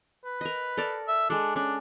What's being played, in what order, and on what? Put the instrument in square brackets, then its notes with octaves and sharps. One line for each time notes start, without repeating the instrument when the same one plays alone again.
[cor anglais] B4
[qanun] A#4 D#5
A4 A#4 D5
[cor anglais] E5
[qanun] G#3 A4 [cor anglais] D4
[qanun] C#4 [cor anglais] D4